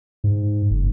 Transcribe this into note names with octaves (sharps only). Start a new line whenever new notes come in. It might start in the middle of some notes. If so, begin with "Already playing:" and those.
G#2
F#1